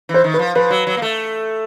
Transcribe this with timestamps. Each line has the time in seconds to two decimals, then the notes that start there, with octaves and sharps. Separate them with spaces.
0.09 E3
0.14 C5
0.24 D#3
0.34 B4
0.39 F3
0.55 F3 B4
0.70 F#3
0.87 F#3
0.97 A#3
1.02 A3